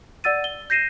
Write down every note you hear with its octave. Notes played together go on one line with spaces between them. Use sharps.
D5 F#5 E6 A6 D#7
G7
G6 A#6 C7 D#7 E7